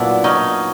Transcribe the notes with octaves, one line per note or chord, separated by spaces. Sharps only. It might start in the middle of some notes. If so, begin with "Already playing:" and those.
Already playing: A#2 F#3 B3 D4 E4
C#4 D#4